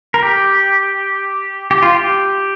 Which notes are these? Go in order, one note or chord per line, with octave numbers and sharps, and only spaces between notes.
A#4
G4
G4
F4
G4